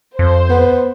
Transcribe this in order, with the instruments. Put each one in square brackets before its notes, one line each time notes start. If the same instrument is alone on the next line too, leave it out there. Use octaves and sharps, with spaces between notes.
[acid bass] F2 [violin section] C5
[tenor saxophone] B3